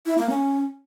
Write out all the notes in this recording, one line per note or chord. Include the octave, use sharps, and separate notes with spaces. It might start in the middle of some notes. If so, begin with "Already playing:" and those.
E4
A#3
C#4